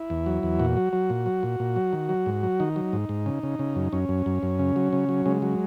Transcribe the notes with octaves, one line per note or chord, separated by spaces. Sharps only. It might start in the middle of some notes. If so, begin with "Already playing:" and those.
Already playing: E4
E2
F#3
E2
A#2 F#4
F#3
F#3
A#2
F#3
A#2
A#2
F#3
D#3
F#3
G#2
F#3
D#3 D#4
F#3
G#2
G#2
C#3
C#3
C#3
F#2
F#2 C#4
F#2
F#2
F#2
C#3
F#3
C#3
F#3
C#3 G#3
F#3